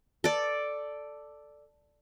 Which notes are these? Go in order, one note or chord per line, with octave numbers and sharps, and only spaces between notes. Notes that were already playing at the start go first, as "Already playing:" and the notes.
A4 D5